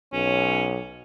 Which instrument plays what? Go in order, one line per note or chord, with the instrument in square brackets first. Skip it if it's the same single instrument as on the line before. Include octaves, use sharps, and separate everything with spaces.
[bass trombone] B1 [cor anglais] C#4